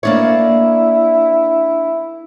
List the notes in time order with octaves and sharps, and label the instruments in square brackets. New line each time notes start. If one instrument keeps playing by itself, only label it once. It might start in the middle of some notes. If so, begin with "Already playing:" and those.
[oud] A#3 D4 C#5 [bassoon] E4